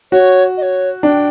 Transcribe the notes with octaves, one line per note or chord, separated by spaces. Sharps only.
F#4 C#5
D#5
C#5
D4 G5